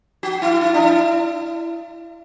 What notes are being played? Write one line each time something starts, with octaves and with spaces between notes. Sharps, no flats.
F#4
E4
E4
D4
E4